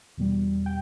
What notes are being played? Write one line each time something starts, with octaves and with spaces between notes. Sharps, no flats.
E2 B2 G3
G5